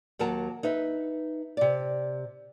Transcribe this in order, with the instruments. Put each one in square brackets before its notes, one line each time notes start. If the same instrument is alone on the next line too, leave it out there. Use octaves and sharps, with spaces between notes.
[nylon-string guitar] D#2 F#3 A#4 A5
D#4 B4 E5
C3 D5